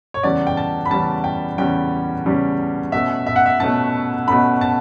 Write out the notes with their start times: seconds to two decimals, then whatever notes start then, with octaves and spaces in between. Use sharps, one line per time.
0.14 C#5
0.23 E2 C#3 G3 C#4 D5
0.47 G5
0.57 A5
0.86 B5
0.91 E2 C#3 G3 C#4 A5
1.24 G5
1.58 E2 C#3 G3 C#4 G5
2.25 E2 C#3 G3 C#4
2.92 B2 A3 C#4 E5
3.27 E5
3.36 F#5
3.46 E5
3.60 B2 A3 C#4 A5
4.28 B2 A3 C#4 B5
4.61 A5